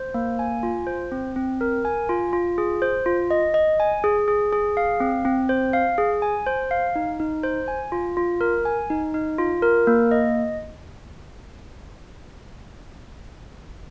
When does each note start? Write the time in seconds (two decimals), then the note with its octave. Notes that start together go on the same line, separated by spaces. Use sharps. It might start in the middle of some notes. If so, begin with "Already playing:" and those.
Already playing: C5
0.14 A#3
0.39 G#5
0.63 F4
0.87 C5
1.12 C4
1.36 C4
1.61 A#4
1.85 G#5
2.09 F4
2.33 F4
2.58 G#4
2.82 C5
3.06 F4
3.31 D#5
3.54 D#5
3.80 G#5
4.04 G#4
4.28 G#4
4.53 G#4
4.77 F5
5.00 C4
5.25 C4
5.49 C5
5.73 F5
5.98 G#4
6.22 G#5
6.46 C5
6.71 F5
6.95 D#4
7.20 D#4
7.43 C5
7.68 G#5
7.92 F4
8.17 F4
8.41 A#4
8.65 G#5
8.90 D#4
9.14 D#4
9.38 F4
9.62 A#4
9.87 A#3
10.11 D#5